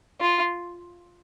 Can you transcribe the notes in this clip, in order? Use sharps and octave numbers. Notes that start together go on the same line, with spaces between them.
F4